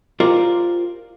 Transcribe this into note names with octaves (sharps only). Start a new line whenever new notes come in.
F4 G4 A#4 C5 D5